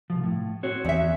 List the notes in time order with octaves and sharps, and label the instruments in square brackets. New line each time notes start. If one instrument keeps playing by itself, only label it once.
[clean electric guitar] C2 F3
A2
C4 F#4 C#5
[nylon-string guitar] E2 E5